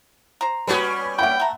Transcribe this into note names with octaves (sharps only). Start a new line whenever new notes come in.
C5 A#5
G3 B3 C#4 F#4 B4
F#3 G4 E5 F#5 G5 B5
A3 A#5